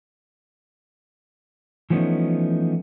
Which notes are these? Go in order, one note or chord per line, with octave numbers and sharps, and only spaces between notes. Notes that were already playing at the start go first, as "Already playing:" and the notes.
E3 F3 A3 B3 C#4 D#4